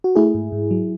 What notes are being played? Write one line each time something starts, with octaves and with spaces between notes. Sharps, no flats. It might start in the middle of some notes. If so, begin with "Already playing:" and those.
F#4
A3 E4 G#4
G#2
G#2
F#3